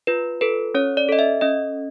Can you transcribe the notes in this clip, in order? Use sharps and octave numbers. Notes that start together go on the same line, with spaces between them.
F4 B4
A4 B4
C#4 C#5
D5
A4 D#5
E5
C#4 D#5